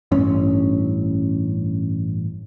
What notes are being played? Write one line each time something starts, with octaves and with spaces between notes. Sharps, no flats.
A1 G2 C#4